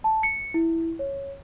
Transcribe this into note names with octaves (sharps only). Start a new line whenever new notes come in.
A5
C#7
E4
C#5